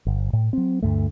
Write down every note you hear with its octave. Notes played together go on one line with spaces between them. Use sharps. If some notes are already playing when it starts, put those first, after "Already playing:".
G1
A2
F#3 C4
D2 G2 A3